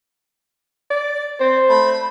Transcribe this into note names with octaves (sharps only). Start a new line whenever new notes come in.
D5
C4 C5
A3 B5